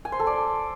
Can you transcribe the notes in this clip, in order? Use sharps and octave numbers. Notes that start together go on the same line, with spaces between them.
G#5
C5
A4
D5